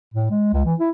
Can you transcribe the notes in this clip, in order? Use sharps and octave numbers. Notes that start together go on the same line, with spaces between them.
A2
G#3
C#2
E3
E4